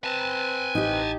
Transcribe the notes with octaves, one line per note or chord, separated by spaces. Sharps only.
C4 B4 G#5 A5
A1 D#4 G4